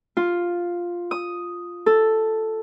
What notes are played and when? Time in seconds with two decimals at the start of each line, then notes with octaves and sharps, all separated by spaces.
0.17 F4
1.11 D#6
1.86 A4